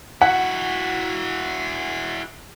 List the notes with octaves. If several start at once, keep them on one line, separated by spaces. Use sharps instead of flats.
E4 F#4 F#5